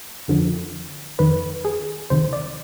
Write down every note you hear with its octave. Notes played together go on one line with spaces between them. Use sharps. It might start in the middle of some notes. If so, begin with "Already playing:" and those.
F2 D3 F3
F2 D#3 B4
G#4
D2 C3 D#3 C5
D5